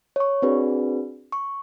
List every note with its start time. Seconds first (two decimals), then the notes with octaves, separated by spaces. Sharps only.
0.16 C#5 C#6
0.42 C4 D4 F#4 G#4 B4 D5
1.32 C#6